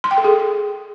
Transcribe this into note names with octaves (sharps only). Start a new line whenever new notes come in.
C6
G5
A4
G#4